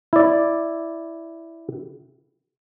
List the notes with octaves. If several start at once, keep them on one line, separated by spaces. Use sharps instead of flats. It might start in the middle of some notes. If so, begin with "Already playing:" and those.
E4 D5